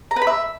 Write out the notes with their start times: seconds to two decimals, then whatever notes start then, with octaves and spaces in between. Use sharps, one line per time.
0.11 A#5
0.16 B4
0.22 B5
0.27 E5